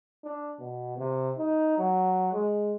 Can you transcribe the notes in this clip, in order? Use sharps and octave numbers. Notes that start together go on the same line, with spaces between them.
D4
B2
C3
D#4
F#3
G#3